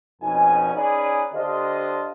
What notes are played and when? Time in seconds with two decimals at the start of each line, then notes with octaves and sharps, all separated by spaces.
0.22 F2 B2 C#4 D#4 G#5
0.74 C#4 D#4 G#4 B4 D5
1.34 D3 D4 F4 G4 C5 D#5